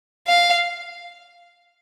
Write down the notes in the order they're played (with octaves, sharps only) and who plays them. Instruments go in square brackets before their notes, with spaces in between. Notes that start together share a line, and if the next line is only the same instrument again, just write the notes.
[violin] F5